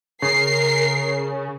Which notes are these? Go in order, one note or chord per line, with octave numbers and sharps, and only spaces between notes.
C#3 A#4 C7